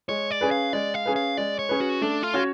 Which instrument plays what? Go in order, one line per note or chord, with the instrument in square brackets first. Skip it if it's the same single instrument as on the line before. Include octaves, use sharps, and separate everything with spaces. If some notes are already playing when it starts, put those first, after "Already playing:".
[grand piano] G#3 [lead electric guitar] C#5
[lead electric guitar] D5
[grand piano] C#4 G#4 B4
[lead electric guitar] F5
[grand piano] G#3 [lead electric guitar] D5
[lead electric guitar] F5
[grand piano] C#4 G#4 B4
[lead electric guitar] F5
[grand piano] G#3 [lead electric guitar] D5
[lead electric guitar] C#5
[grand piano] C#4 G#4 B4
[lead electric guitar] F#4
[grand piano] A3 [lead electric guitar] D4
[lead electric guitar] F4
[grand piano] C#4 F#4 C#5